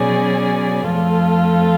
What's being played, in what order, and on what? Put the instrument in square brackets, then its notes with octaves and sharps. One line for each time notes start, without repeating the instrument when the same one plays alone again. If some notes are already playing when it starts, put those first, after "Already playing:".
Already playing: [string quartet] B2 F#3 C#4 G#4 D5
F2 F3 A3 F4 A4